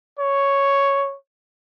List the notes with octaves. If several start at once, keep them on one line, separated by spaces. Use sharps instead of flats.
C#5